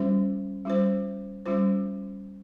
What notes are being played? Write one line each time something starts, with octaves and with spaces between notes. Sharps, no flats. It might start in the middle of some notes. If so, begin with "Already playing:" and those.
Already playing: G3 C#4 F4 C5
G3 C#4 F4 C5
G3 C#4 F4 C5